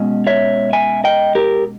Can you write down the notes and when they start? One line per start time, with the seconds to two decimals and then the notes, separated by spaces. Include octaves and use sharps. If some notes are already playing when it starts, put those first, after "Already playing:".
Already playing: B2 G#3 C#4
0.27 C#5 E5
0.73 E5 G#5
1.04 D#5 G5
1.35 G4 A#4